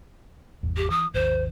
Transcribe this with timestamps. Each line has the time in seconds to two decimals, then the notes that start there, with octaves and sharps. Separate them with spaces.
0.63 G#1 E2
0.77 G4
0.90 E3 D#6
1.14 G#1 D#2 C5